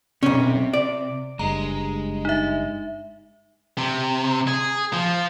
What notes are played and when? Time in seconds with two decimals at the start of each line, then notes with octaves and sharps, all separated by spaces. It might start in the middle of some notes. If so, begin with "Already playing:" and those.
0.23 B1 C3 C4 C#4
0.73 D5
1.39 F#1 G2 G#3 A#5
2.25 D#4 E5
3.78 C3
4.48 G#4
4.93 F3